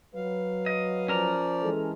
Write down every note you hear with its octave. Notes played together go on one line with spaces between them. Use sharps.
F#3 B4 F5
D#5
F3 C#4 A#4 D5 A#5
E3 G#3 A4